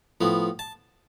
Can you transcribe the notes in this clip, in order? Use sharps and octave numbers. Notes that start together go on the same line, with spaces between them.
A2 F3 B3
A5